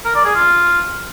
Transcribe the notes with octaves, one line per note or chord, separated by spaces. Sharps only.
A#4
D5
G#4
F4